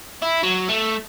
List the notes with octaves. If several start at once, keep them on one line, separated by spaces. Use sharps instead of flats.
E4
F#3
A3